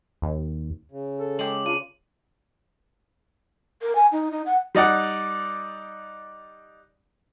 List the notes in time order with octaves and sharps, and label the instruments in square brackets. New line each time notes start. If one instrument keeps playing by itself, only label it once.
[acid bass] D#2
[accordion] C#3
[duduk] A4
[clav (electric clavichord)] G#3 G4 [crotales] D6 F#7
[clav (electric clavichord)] D4 [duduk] F4 [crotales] D#7
[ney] A#4
G#5
D#4
D#4
F#5
[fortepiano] G3 D#4 D5 F#5